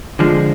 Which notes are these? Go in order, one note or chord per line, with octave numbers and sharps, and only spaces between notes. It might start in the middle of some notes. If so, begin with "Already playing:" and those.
F2 D3 F3 G#3